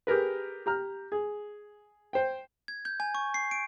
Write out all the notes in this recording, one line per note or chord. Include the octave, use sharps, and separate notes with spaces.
G4 G#4 A#4 B4
G4 A#5 F6
G#4
C5 G5
G#6
G6
G#5
C#6
C7
D7